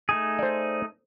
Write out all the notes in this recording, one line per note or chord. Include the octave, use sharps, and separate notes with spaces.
A3 D#4 G#4
C5 D5